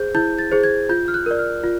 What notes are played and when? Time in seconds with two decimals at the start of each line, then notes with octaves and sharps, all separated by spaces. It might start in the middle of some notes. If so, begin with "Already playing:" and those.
Already playing: G#4 C5 G6
0.15 E4 G6
0.39 A6
0.51 G#4 C5
0.63 G#6
0.89 F4 G6
1.08 F6
1.14 F#6
1.26 A#4 D5
1.39 F6
1.63 F4